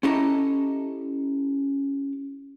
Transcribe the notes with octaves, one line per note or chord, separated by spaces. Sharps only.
C#4 E4 G4 A4 D#5 A#5